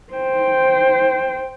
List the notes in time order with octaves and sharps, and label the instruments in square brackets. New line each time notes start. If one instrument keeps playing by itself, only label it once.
[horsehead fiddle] C5 G5